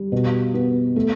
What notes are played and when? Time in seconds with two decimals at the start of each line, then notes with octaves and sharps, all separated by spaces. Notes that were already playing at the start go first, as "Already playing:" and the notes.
Already playing: G3
0.12 B2
0.54 B3
0.96 A3